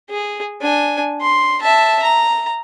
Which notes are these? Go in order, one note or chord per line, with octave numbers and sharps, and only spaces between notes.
G#4
D4 G#5
C6
E5 A5
A#5